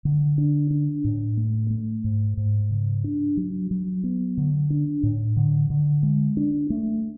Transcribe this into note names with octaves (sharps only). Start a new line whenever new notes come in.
D3
D4
D4
A2
A3
A3
G#2
G#2
C#3
D4
F#3
F#3
B3
D3
D4
A2
D3
D3
G#3
D4
A3